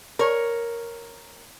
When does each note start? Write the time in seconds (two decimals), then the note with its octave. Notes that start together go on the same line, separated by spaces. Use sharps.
0.19 A#4 C#5